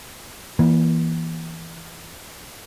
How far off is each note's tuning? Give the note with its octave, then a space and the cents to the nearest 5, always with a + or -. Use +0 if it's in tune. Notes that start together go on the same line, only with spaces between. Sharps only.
E3 +0 A#3 +35